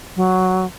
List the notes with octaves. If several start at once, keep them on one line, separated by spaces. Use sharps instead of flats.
F#3